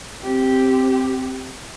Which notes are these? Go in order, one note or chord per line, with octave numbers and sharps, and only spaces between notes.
C4 G4